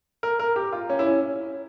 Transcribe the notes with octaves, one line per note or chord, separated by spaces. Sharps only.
A#4
A#4
G4
F4
C#4
E4
C#4